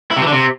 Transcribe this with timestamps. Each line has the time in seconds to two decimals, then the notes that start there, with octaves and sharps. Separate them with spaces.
0.11 E4
0.16 C3
0.22 E3
0.27 D3
0.32 C3